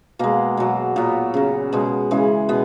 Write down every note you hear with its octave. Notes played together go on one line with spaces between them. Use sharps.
B2 G#3 A#3
B2 F#3
A#2 F#3 B3
C#3 F#3
B2 G#3
C#3 E3 G#3
B2 B3